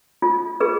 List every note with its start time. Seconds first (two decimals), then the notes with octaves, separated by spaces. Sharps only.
0.22 F4
0.60 G#4 B4